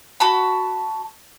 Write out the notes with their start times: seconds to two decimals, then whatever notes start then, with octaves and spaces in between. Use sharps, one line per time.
0.20 F#4 A5 B5